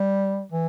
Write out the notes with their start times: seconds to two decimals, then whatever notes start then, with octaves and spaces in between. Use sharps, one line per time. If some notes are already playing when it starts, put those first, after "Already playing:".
Already playing: G3
0.52 E3